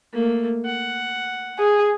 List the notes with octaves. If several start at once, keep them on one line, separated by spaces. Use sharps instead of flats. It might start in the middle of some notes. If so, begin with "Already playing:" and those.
A3 A#3
F#5
G#4